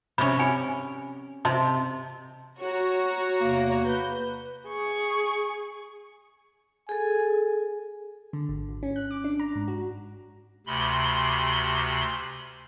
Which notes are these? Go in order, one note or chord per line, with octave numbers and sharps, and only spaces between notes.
C3 C#4 B5 C#6
C#5 G#5
C3 D#5 A5 C6
F#4 C#5 A#5
E2 C3 A#3
B4 G6
G#4 C#6
G#4 A4 G#5
D3
G#1
G#1
C#4
F#6
D6
D4
A#5
G#2
F#4
D2 C3 B5 C6